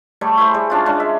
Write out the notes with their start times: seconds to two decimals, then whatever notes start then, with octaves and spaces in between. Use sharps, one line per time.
0.21 G3 A3 C#5
0.38 E4 G#4 C5
0.54 G3
0.70 C#4 D4 F4
0.86 G#3 C#4 D4 F5
1.00 E5